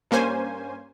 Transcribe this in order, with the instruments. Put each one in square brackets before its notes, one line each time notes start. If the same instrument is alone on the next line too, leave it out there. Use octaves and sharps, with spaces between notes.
[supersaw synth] G2 A#3 C#4 C5 G#5